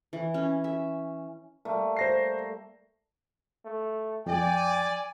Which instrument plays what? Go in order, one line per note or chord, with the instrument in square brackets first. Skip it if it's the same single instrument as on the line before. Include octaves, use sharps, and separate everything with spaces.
[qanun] E3
C#4
E5
[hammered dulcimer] G3 A3 A#3
[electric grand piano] C5 A#6 C7
[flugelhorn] A3
[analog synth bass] F2 [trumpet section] D5 [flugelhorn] G5 [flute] G#5